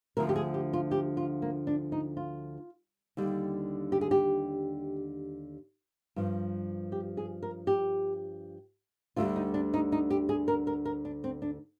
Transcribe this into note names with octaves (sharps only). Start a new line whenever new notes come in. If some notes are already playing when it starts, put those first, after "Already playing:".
D2 D3 F3 A#4
G4
G#4
G4
F4
G4
F4
A#3
D4
D#4
F4
D#2 D3 G3
G4
G#4
G4
G2 F3
G4
G#4
A#4
G4
D2 D3 G3 F4
D#4
D4
D#4
D#4
G4
G#4
A#4
A#4
A#4
D4
C4
D4